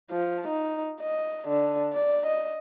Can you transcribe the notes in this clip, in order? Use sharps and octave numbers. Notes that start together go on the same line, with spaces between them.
F3
D#4
D#5
D3
D5
D#5